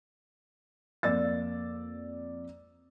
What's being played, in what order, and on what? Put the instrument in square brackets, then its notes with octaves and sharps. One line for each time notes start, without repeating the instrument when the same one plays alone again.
[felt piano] F2 A#3 D5 E6 A6